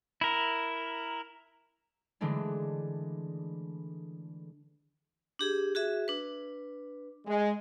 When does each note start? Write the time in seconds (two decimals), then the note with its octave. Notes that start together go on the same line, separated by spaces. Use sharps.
0.21 E4 A#4
2.21 D3 E3 G#3 A3 D4
5.39 D4 G4 G#4
5.75 F#4 G#4 E5
6.08 D4 B4
7.26 G#3